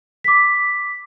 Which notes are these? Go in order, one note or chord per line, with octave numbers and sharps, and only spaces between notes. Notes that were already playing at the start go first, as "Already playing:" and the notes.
D6 B6